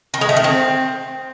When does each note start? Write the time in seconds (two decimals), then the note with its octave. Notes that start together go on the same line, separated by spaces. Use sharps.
0.14 D#3
0.21 G#3
0.29 A3
0.36 D#3
0.44 C4